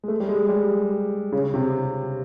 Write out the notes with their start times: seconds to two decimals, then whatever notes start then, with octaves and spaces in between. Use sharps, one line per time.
0.04 G#3
0.08 A3
0.20 G3
0.29 G#3
0.49 G3
1.33 C#3
1.54 C3